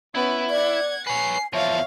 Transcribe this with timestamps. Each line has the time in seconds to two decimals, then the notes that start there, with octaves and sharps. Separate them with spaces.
0.15 B3 C#4 E4
0.50 D5 F#5 G#6
1.07 B4 C#5 G#5 C7
1.53 E2 F3 C#5 E5 F5